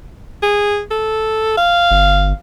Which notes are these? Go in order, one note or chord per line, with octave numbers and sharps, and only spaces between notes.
G#4
A4
F5
G1